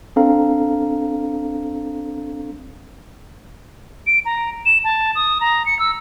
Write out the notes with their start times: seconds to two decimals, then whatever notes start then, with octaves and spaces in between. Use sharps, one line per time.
0.16 C4 D4 A4 F5 A#5
4.07 D7
4.25 A#5
4.66 E7
4.84 A5
5.15 D#6
5.41 A#5
5.66 C#7
5.79 E6